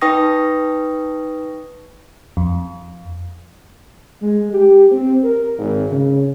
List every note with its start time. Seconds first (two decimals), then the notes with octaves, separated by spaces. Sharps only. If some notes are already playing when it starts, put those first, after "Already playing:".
0.01 D#4 B4 G5 C#6 D#6 A#6
2.37 F2
4.21 G#3
4.53 G4
4.91 C4
5.23 A#4
5.57 G#1
5.91 C#3